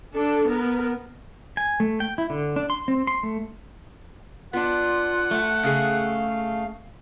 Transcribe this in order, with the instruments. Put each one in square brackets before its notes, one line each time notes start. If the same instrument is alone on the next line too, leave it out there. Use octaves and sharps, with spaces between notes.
[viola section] D4 A4
B3 A#4
[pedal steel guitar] G#5
A3
G5
E4
D3
D4
C6
C4
C6
A3
[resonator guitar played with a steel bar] B3 D4 [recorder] F4 [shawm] F#5
[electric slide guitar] A3
[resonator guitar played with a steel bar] C#3 G#4 [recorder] F5